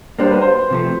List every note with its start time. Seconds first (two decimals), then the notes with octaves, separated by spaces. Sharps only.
0.19 G3 A#3 D4 G4 C5
0.30 B4
0.42 C5
0.70 C3 F3 A3